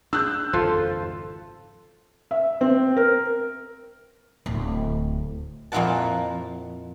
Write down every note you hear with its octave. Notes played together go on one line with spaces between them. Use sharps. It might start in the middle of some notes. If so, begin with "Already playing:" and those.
D4 E6 F#6 G6
G#1 F2 C#3 F4 A4 C5
E5
C4
A#4
D1
F2 A#2 A#3 E4 F#5 A5